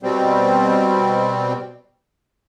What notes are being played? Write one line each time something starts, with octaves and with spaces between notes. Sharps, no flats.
B2 G3 C4